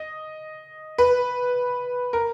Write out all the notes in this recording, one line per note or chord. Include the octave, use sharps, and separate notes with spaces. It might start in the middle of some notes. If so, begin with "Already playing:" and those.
Already playing: D#5
B4
A#4